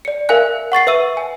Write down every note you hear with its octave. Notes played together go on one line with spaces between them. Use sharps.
D5 C#7
A#4 E5 F5 G#5 F#6
F#5 C#6 A6 C7
B4 E5 E6 D#7
G#5